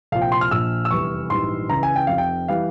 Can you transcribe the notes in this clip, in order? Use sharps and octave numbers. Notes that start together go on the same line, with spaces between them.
C2 A#2 F3 F5
G5
C6
F6
A#1 A#2 F3 E6
E6
F1 E2 E3 G3 C#6
A#1 G#2 E3 G3 C6
C#2 C#3 E3 A#5
G#5
G5
F1 F2 C3 F5
G5
E3 G3 F5